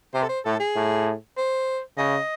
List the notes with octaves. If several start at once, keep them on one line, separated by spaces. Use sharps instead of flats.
C3 C5
A4
C5
A2 A4
G#4
A2
C5
C#3 D#5